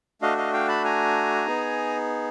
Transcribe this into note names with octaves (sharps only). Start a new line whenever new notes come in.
A3 D4 F#4 D#5 F5
D#5 F5
F5 G5
A5 B5
G#5 A#5
B3 D#4 G#4